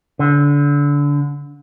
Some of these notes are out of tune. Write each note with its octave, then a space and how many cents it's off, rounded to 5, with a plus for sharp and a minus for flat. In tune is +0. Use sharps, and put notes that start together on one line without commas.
D3 -25